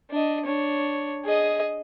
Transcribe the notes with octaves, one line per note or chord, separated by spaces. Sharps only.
D4 D#5
D4 C#5
G#4 D#5